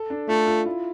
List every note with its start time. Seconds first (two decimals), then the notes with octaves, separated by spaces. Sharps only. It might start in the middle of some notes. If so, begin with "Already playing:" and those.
Already playing: A4
0.10 D4
0.29 A3 F4
0.47 F4
0.66 E4